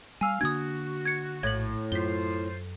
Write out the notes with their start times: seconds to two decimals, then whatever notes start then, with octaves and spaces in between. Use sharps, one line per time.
0.21 G3 F5 G#5 E6
0.41 D3 A#3 D4 F#4 D#6 G#6
1.06 G#6 C#7
1.43 A#1 A2 G#6 F#7
1.92 F#2 F4 C5 B6 G7